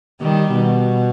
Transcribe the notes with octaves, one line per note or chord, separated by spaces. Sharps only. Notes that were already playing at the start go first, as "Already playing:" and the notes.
D#3 G3
B2